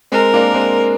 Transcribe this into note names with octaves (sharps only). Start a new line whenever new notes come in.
G#3 C4 A#4
A#3 D4
G#3 C4